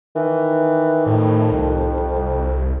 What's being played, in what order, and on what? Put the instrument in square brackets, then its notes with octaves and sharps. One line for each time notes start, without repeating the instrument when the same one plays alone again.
[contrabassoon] D#3 [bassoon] E3
[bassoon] F2 [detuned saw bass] A2
[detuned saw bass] C2